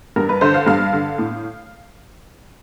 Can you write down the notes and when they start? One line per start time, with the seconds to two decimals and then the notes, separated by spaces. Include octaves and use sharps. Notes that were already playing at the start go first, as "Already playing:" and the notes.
0.16 G2 A#4
0.29 B4
0.41 D3 C5
0.54 F5
0.67 G2 F5
0.93 D3
1.18 A2